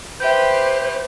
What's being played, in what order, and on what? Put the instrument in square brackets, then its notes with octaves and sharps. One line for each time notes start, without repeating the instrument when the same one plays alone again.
[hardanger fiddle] G4 B4 [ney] C5 [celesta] E5 G6